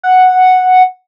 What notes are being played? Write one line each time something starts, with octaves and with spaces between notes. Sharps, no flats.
F#5